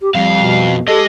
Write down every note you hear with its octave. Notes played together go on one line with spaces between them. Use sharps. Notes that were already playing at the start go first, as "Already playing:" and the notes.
G4
F2 G3 F5
B2
G#3 G4 A4 D#5